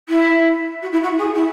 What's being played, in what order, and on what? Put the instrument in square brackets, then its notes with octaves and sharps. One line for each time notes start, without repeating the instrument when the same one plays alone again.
[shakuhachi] E4
F#4
E4
F#4
G#4
E4